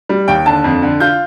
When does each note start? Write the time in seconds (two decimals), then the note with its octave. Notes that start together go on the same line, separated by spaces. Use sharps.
0.09 G3
0.27 D#2 G5
0.46 D3 A5
0.64 F2
0.82 D3
1.00 F4 G6